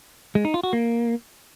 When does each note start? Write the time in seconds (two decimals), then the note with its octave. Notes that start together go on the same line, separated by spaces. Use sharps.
0.35 G#3
0.45 D#4
0.54 F4
0.63 F#4
0.73 A#3